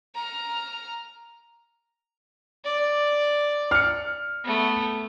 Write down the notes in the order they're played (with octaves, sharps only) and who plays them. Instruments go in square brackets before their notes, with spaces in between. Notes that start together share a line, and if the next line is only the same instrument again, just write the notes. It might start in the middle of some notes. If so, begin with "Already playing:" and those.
[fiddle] A#5 F6
[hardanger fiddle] D5
[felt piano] F6 C#7
[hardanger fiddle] A3 B3